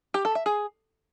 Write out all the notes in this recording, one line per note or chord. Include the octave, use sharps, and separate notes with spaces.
G4
A4
E5
G#4